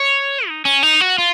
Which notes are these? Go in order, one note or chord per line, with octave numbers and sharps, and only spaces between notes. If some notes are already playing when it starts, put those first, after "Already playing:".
Already playing: C#5
D#4
C#4
D#4
F#4
F4